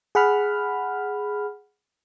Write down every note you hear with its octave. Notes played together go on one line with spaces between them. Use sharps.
G#4 F#5 B5 F6